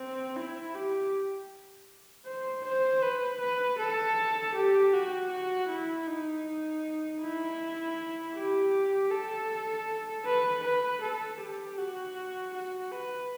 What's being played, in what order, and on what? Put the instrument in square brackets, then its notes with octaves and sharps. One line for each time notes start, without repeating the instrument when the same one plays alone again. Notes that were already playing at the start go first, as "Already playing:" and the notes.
Already playing: [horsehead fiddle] C4
E4
G4
C5
C5
B4
B4
A4
G4
F#4
F#4
E4
D#4
E4
G4
A4
B4
B4
A4
G4
F#4
F#4
B4